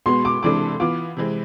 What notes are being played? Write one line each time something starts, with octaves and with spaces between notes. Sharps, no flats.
B2 G#3 B3 C6
D6
C3 E3 G#3 D4 A4 D6
E3 B3 F4 D6
C3 E3 G#3 C4